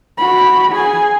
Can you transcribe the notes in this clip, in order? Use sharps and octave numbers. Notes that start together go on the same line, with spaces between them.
F#4 B5
G#4 G#5